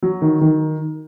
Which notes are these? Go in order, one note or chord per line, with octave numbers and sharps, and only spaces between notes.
F#3
D#3
D#3